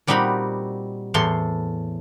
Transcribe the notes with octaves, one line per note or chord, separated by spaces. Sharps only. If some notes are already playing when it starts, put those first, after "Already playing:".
A#2 G3 C4 D#4 F#4 B5
E2 A2 A4 C6